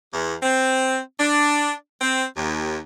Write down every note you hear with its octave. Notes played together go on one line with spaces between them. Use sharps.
E2
C4
D4
C4
D#2